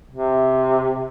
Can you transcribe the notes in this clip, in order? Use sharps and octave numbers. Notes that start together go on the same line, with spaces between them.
C3